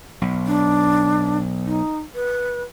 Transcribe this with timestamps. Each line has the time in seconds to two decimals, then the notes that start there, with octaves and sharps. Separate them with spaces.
0.22 B1
0.47 D4
1.66 D#4
2.15 B4